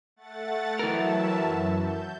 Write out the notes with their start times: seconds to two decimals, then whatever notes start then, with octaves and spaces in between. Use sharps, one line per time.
0.16 A3 F#5 A6
0.79 E3 F#3 A#4 E5 A5
1.39 F#2
1.79 G6